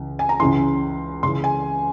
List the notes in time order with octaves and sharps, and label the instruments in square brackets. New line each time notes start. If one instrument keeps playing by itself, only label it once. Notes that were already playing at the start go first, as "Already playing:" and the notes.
Already playing: [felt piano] C#2 C#3 E3
G#5
A#5
C#2 C#3 E3 C6
C#2 C#3 E3 C6
G#5